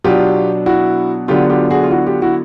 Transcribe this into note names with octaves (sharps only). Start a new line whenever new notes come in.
B2 F#3 B3 D4 F4 G4
E4 F#4
D3 F#3 B3 D4 F4 G4
F4 G4
F#4 G#4
F4
E4 F#4
F4 G4
E4 F#4